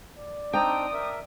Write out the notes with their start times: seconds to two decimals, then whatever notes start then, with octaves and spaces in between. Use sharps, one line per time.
0.16 D5
0.53 C4 D4 D#4 G5 A#5 D#6
0.93 A#4 E5